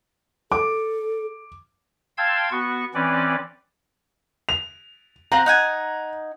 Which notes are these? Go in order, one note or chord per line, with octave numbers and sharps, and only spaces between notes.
A4 D6
F5 G5 A5 C6 E6 G#6
B3 F#4 C#6
E3 C4 C#4 B4 D5
F7
C4 F4 F#5 A#5
D#4 F#5 G#5